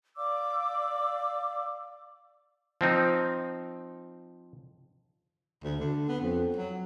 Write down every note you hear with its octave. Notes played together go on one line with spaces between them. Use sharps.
D5 F5 D6 E6
F3 C4 D#4
D2
D3
B3
F2
F#3